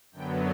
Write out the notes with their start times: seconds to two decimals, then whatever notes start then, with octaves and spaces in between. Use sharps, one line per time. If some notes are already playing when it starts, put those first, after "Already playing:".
0.12 F#2 D3 F#3 B3 G5